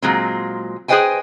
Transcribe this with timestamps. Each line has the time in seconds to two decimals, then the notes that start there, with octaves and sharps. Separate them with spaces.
0.02 A#2 F#3 G#3 C4
0.88 G#4 B4 C5 D#5 G5 G#5